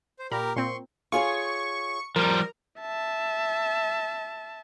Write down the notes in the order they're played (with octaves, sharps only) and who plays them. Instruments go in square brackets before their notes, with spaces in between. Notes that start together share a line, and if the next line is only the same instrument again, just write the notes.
[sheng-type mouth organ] C5
[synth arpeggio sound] A#2 A#5 B5 [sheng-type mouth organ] G4 A#4
[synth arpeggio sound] A#2 C4 [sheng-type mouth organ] C6 C#6
[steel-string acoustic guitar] F4 G#4 C#5 [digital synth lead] C#6
[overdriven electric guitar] F3 G3 [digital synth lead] A#4
[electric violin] E5 A5